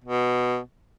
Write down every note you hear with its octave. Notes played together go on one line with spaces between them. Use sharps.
B2